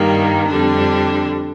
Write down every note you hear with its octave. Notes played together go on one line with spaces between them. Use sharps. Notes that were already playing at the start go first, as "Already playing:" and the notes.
Already playing: G2 D#3 G3 A#3
F2 D3 G3 D4